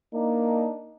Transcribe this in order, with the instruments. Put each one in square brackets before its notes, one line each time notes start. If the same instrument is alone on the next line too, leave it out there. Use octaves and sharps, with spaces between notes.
[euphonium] A#3 [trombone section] D4 D#4